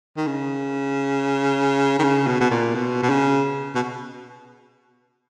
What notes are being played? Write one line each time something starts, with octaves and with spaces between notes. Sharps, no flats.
D#3
C#3
D#3
C#3
B2
B2
A#2
B2
B2
C#3
B2